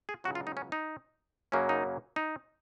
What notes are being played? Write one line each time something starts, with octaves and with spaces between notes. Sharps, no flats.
G#4
C#2 C#3 F#3 F#4
F4
D#4
C#4
D#4
F#2 C#3 F#3 A#3 C#4
D#4
D#4